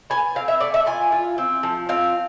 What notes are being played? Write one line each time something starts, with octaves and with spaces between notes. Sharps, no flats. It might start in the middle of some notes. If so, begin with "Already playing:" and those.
B3 G#5
C4 F5
E5
A3 D5
E5
F4 G#5
F4
C4
F3
C4 F5